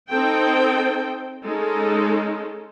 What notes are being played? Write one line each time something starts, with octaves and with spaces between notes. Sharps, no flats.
C4 D#4 A4 C5 G5
G#3 C#4 D#4 A4